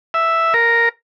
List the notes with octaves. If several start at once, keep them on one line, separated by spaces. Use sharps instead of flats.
E5
A#4